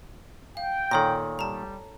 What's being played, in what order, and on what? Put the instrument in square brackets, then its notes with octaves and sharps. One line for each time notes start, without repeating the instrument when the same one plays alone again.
[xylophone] F5 [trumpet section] G5
[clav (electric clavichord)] A#2 D#3 [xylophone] A4 C#5 A#6
[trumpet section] G3 [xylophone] A5 A#5